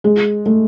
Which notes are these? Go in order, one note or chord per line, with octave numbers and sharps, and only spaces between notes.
G#3
A3